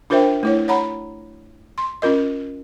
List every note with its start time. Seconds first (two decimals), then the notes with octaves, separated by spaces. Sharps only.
0.10 D4 F4 A#4 C5 E5 G5
0.43 A3 E4 C#5
0.68 C#5 F#5 A#5 B5
1.78 C6
2.02 C#4 F4 A#4 D#5